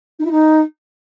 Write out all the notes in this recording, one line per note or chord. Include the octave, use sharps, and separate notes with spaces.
D#4
E4
D#4